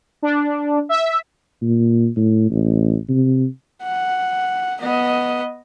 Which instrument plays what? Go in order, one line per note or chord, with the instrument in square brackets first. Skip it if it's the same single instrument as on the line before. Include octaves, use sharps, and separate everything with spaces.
[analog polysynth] D4
E5
[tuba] A#2
A2
A1
C3
[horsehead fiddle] F#5
B3 D#5